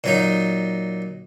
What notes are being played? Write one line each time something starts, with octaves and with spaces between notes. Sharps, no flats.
A#2 F#3 D#4